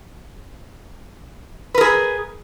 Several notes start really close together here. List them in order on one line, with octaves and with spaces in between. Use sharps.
B4 A#4 G#4